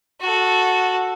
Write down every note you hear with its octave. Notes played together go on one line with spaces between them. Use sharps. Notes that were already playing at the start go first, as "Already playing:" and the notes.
F#4 A4